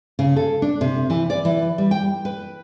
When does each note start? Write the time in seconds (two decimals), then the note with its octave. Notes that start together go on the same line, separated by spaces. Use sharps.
0.19 C#3
0.36 A4
0.62 D4
0.81 C3
1.10 E3
1.30 D5
1.45 E3
1.78 G3
1.91 G5
2.25 B4